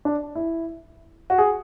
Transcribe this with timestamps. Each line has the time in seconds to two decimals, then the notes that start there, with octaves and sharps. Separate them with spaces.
0.05 D4
0.35 E4
1.30 F#4
1.38 G#4